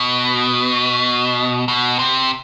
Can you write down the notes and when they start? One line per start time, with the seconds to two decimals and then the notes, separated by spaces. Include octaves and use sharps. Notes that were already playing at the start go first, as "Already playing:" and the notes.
Already playing: B2
1.68 B2
1.99 C3